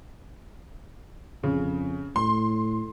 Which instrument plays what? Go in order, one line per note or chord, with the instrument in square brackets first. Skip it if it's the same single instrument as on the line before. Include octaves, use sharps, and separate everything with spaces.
[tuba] F2 [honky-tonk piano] C#3
[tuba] A2 [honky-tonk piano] C6